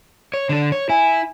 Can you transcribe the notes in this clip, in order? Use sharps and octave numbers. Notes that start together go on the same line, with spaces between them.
C#5
D3 A4
C#5
E4 G#5